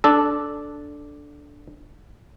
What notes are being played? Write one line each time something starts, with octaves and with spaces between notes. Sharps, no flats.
D4 A4